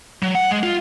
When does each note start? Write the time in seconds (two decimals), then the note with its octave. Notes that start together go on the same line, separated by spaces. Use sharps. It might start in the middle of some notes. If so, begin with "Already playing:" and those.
0.23 F#3
0.35 F#5
0.51 G#3
0.63 F4